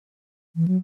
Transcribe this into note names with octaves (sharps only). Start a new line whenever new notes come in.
E3
F#3